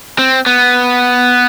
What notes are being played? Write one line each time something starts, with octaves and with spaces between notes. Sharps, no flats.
C4
B3